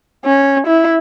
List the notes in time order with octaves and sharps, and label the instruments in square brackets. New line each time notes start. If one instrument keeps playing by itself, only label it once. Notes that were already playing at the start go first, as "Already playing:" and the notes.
[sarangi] C#4
E4